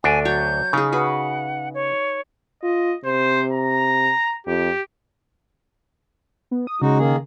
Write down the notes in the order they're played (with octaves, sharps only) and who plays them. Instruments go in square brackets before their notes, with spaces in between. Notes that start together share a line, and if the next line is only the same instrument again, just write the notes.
[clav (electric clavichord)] D2 D4 [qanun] A4 [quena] G#5
[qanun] F#3 C#5 [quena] G6
[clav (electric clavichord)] C#3 [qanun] D#4 G#4
[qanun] F#4 B4 [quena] F#5
[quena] C#5
[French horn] F4 [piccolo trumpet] D#5
[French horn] C3 [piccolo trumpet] C5
[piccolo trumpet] A#5
[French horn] F2 [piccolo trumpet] G4
[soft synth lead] B3
D#6
[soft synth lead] C#3 [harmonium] G#3 D#4 F#4
[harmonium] D#3 A#3 G#4